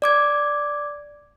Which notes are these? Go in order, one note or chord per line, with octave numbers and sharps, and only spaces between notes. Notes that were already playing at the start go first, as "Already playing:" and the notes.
D5 D6 G#6